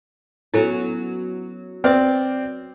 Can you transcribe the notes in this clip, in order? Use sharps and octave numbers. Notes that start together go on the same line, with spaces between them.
F#3 B3 C#4 E4 A4
C4 B4 D5 D#6